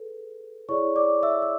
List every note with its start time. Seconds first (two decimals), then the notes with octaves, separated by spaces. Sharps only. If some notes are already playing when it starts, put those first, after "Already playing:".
Already playing: G#4 A4 B4
0.69 E4 G#4 C#5 D5 C#6
0.96 D5 D6
1.23 E5 E6
1.42 E6